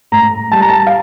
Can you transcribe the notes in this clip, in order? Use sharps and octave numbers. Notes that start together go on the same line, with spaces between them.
A2 A#5
G3 A5
A#5
A5
F5